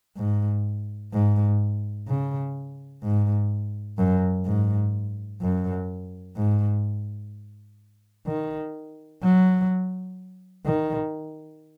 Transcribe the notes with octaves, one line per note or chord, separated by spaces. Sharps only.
G#2
G#2
C#3
G#2
F#2
G#2
F#2
G#2
D#3
F#3
D#3